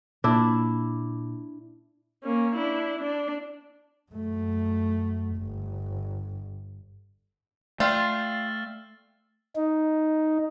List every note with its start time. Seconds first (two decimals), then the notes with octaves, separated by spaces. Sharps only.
0.24 A#2 D4 E4
2.24 A#3 C#4
2.55 D4 E4
2.99 D4
4.12 F#2 A3
5.37 G1
7.80 A3 F4 D5 G5 E6 F6 A6 C7
9.56 D#4